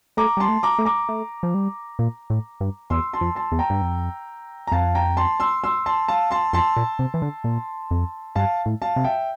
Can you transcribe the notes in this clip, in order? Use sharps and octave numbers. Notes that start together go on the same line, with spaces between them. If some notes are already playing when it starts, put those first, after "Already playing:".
A3 A#5 D6
G3 A5 C6
A3
A#5 D6
A3
A#5 D6
A3
F3
G3
A#2
A2
G2
E2 C6 E6
A5 C6
F2
A5 C6
E2
G5 A#5
G2
F2
A#5
F2 F5 A5
G5 A#5
A5 C6
C6 E6
C6 E6
A5 C6
F5 A5
A5 C6
F2 A5 C6
A#2
C3
E3
D3
A#2
F2
G2 F5 A5
A2
F5 A5
C3
E5 G5